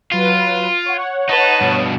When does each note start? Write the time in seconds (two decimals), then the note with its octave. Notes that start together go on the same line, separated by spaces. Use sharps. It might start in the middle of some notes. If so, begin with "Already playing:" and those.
0.12 F#3 F4 B4 D#7
0.86 C#5 F#5
1.29 D#4 B4 A5
1.61 G2 B2